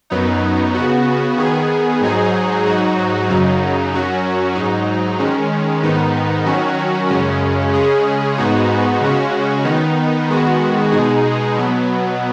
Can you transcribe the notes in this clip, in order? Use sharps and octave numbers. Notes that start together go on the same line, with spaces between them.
F#2 F#3 B3 D#4
C#3 B3 F#4
D#3 B3 G#4
G#2 F#3 D#4 G#4
G#2 F#3 D#4 F#4
F#2 C#3 F#3 D#4
F#2 F#3 C#4 F#4
G#2 F#3 D#4
D#3 G#3 C#4
G#2 D#3 B3 D#4
D#3 F#3 C#4 F#4
F#2 C#3 G#3 C#4
C#3 G#3 C#4 G#4
G#2 G#3 B3 D#4 F#4
C#3 G#3 C#4 F#4
D#3 B3 D#4
D#3 G#3 B3 F#4
B2 G#3 D#4 G#4
B2 F#3 B3